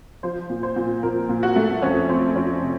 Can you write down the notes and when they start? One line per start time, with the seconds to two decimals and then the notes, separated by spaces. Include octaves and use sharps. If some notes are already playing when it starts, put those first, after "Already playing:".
0.23 F3 C5
0.50 A#2
0.63 C5
0.76 A#2
1.03 A#2 A#4
1.29 A#2
1.43 F#4
1.56 A3
1.82 F2 C#4
2.09 F2 C4
2.35 F2 C#4
2.62 C3